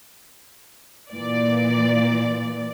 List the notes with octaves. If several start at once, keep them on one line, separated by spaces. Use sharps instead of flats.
A#2 E3 D5